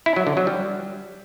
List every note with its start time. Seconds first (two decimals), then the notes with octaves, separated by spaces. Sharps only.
0.06 E4
0.16 F#3
0.27 D3
0.37 F#3
0.47 G3